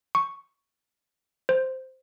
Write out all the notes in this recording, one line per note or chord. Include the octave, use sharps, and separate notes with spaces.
C#6
C5